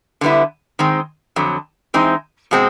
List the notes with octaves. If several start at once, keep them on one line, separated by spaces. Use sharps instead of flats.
D3 G3 B3 E4
D#3 G#3 C4
F2 D3 F#3
E3 G#3 C4 D#4
B2 G#3 C4